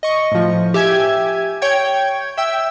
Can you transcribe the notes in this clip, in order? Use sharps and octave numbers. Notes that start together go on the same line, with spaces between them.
D#5 C#6
A2 F3
G4 E5 G#5 G#6
C#5 G5 G#6
E5 G5 E6